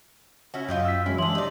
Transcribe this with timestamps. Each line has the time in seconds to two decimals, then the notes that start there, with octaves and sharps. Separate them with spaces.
0.54 C#4 E4 F#4
0.69 F#2 F4 D#5 G5
0.85 E6 B6
1.06 F#3 G#3 C#4 E4
1.18 E3 D4 G#4 E5 C6 E6 F#7
1.35 D#4 G4 D5